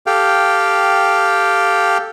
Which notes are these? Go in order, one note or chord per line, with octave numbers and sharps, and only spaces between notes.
G4 A4 F5 G5